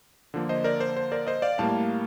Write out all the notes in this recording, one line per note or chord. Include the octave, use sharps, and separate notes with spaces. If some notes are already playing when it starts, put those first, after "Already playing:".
D3 F3 A#3
C5 D#5
A#4 D5
C5
C5
A#4 D5
C5 D#5
D5 F5
A2 G3 A#3 F5 A5